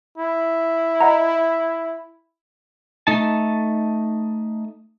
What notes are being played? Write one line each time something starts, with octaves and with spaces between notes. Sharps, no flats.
E4
D#5 F#5 A#5
A3 D#4 A5